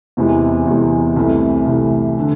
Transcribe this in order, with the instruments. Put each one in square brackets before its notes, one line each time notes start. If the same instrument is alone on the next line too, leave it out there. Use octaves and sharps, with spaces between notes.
[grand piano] E2 C3 E3 G#3
E2 C3 E3 G#3
C2 C3 E3 A3
C2 C3 E3 A3
D3